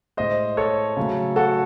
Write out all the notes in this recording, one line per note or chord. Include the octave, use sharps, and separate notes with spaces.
A2 G#3 C5 D#5
A4 C#5
C#3 F#3 A3
F#4 A4